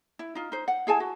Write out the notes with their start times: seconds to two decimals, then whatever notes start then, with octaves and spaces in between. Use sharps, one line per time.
0.19 E4
0.35 D#4 F4
0.52 D#4 C5
0.68 F#5
0.87 E4 G#4 G#5 A5
1.00 F#4